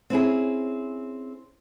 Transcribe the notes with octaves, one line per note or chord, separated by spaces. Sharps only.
C4 C#4 E4 G#4